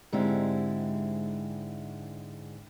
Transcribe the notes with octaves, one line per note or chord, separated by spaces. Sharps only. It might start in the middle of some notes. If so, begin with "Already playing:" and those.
G#2 D3 G#3 C4 E4 G4